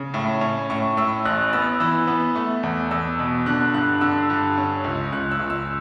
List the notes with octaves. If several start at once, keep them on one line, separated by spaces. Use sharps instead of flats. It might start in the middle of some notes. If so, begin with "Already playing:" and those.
Already playing: C#3
A2
C#4
A2 C#6
A2 E6
A1 F#6
B3 E6
E3 E6
B3
A3
E2
E2 E6
B2
D3 F#6
G2 F#6
D3 E6
G2
C#4
C#2
C#2 F#6
E6
C#2
E6